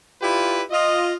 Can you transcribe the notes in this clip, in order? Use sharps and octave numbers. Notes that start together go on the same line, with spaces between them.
E4 F4 G4 B4 D5
F4 D#5